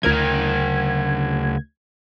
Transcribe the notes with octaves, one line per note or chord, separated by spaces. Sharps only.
D2 C#3 A#4 A#5 G#6